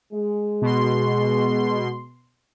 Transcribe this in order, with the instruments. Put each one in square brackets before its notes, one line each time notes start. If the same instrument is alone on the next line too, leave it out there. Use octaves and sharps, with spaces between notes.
[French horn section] G#3
[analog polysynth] B2 C6